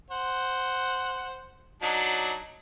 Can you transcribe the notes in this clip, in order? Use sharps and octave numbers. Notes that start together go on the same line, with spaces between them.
C5 F#5
F#3 D4 D#4